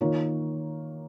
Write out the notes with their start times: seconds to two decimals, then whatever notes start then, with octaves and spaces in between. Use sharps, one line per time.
0.01 D#3 A#3 F4 A#4 C#5